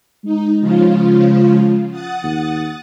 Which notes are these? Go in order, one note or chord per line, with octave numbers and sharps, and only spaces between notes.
G#3 D#4
C#3 F3 F4
F#5 D#6 A6
D#2